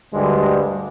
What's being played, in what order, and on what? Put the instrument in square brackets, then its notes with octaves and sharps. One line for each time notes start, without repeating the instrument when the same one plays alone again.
[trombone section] D2 G2 D3 G3 G#3